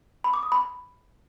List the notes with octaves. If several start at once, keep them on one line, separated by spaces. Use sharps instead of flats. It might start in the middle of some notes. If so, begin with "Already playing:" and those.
B5
D6
D#6
B5